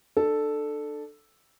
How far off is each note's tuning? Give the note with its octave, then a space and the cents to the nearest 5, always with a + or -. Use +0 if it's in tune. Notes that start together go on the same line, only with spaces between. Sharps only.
D4 +30 A4 +0